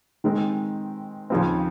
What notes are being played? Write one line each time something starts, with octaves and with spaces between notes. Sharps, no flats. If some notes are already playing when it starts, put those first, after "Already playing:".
D#3 G#3 C4
D#2 C#3 F3 C4